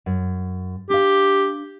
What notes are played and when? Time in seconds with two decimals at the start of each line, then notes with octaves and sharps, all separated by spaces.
0.06 F#2
0.90 D4 G4 F5